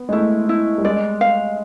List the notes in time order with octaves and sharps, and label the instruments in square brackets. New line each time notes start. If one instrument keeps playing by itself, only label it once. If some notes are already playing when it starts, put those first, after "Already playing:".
Already playing: [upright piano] B3
G#3
[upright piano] A3 [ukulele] E4
[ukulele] E4
[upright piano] G3
[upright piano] G#3 [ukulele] D5
[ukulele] F5